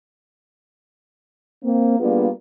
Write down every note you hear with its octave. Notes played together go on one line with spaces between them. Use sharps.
A#3 C4
G3 A#3 B3 D4 F4 G#4